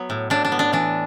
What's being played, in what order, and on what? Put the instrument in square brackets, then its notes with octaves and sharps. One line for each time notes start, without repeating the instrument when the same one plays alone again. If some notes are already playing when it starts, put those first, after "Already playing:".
Already playing: [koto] F#3 B3
A2
A2 D4
D4
B3
D4
E3 D4